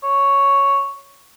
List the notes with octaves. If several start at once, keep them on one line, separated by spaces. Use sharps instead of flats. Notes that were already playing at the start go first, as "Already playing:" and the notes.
C#5